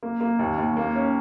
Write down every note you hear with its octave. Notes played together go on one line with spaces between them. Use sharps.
A#3
A#3
D#2
D#2
A#3
C#4